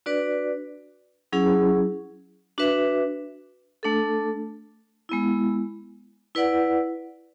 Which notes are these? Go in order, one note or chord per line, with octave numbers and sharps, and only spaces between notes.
D4 F#4 B4 D5
F#3 C#4 E4 G#4
D4 F#4 B4 E5
A3 D4 A4
G#3 B3 E4
E4 B4 D5 F#5